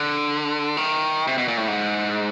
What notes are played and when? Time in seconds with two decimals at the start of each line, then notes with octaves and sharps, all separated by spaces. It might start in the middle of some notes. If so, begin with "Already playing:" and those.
Already playing: D3
0.77 D#3
1.27 C3
1.38 B2
1.48 A#2
1.57 A2
1.68 G#2